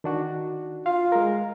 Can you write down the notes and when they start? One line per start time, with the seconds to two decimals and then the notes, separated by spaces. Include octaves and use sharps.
0.04 D#3 D4 F#4
0.86 F4 F5
1.12 G#3 A#4